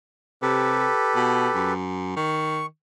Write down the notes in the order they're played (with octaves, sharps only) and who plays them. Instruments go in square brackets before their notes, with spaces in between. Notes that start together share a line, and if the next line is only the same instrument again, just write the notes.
[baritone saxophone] C3 [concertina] G4 A4 B4
[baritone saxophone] B2
F#2
[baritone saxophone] D#3 [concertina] C#6